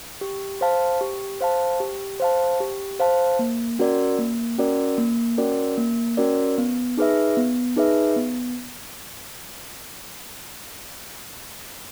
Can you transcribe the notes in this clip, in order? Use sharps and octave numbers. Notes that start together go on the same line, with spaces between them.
G4
C5 F5 A5
G4
C5 F5 A5
G4
C5 F5 A5
G4
C5 F5 A5
A#3
C#4 F#4 A#4 D5
A#3
C#4 F#4 A#4 D5
A#3
C#4 F#4 A#4 D5
A#3
C#4 F#4 A#4 D5
B3
D#4 G#4 B4 E5
B3
D#4 G#4 B4 E5
B3